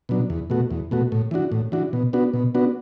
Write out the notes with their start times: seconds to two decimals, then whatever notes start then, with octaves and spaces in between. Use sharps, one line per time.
0.09 B2 F#3 D4
0.30 E2
0.50 B2 A3 F#4
0.71 E2
0.91 B2 A3 F#4
1.12 A2
1.31 E3 D4 F#4
1.52 A2
1.72 E3 D4 F#4
1.93 B2
2.13 B3 D4 F#4
2.34 B2
2.55 B3 D4 F#4